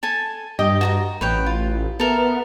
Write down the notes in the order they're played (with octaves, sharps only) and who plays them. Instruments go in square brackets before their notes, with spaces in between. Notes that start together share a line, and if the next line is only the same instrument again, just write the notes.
[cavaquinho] A4 G#5 A5
[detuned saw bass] G2 [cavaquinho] G4 D#5 G5
[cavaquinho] F#4 A5 A#5
[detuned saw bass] A1 [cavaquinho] B4 C#5 G5
[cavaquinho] F4
[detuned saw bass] B3 [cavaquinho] A4 A#4 E5